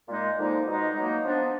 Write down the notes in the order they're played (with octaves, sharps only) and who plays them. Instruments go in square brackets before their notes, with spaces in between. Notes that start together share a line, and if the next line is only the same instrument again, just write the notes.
[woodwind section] A#2 G#3 D#4
D3 F3 A#3 D#4
B2 G#3 D#4
B2 F#3 A#3 D#4
F3 B3 D4